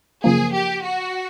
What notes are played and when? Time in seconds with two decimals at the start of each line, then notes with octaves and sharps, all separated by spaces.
0.24 F#2 C#3 F3 A#3 G#4
0.54 G4
0.85 F#4